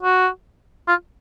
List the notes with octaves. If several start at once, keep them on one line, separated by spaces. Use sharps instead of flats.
F#4
F4